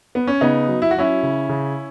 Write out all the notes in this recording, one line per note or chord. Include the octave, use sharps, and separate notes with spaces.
B3
C#4
C#3 B3 D#4
F#3
E4
F#4
F#3 C#4 E4
C#3
C#3